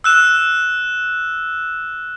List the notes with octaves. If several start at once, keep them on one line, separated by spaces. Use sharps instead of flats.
E6 F#6 E7